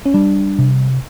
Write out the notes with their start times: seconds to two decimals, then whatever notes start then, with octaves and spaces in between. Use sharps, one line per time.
0.05 C#4
0.14 G3 D4
0.59 C3